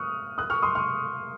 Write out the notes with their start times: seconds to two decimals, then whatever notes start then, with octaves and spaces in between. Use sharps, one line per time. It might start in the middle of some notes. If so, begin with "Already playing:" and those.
Already playing: C#6 D#6 F6 F#6
0.38 D#6 F#6
0.50 C#6 F6
0.62 C6 D#6
0.75 C#6 F6